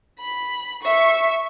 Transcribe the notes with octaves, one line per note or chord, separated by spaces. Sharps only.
B5
E5 C#6